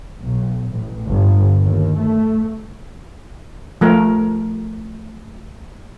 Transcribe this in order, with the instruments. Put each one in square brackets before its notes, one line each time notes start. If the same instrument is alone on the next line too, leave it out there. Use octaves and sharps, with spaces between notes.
[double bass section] B1
A1
G1
D#2
A3
[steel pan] F3 A3 A#4